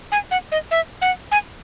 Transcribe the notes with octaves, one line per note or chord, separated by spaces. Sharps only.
G#5
F#5
D#5
E5
F#5
G#5